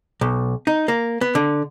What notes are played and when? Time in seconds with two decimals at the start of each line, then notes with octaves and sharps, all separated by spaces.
0.21 B1
0.67 D#4
0.88 A#3
1.21 B3
1.35 D3